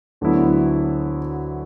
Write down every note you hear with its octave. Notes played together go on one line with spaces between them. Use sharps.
D2 D3 F#3 B3 E4